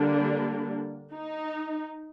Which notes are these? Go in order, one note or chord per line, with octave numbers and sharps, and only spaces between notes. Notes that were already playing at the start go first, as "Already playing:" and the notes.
Already playing: D3 G3 A#3 D4
D#4